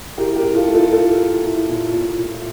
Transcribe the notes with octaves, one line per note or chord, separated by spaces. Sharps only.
A2 G4 A#4
G4 A#4
A2
F4 A4
A2
F4 A4
A2 F4 A4
A2
A2
A#2
A#2
A#2